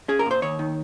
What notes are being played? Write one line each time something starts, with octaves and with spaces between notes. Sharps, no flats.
C#4 G#4
A#4
A#2 C5
D#2 C#5
D#3